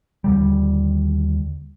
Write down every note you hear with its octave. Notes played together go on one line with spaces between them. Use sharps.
D#2 D3 G3